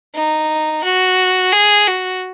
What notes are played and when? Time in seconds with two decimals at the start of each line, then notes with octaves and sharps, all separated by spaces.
0.14 D#4
0.84 F#4
1.52 G#4
1.87 F#4